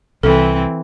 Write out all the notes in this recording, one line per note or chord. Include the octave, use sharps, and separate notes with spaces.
C2 E3 C4 A4